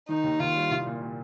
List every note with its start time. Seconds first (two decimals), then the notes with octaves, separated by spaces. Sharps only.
0.09 D#3 D#4
0.24 D#2
0.40 D#2 F4
0.55 G3
0.70 C2
0.86 A#2
1.02 A#2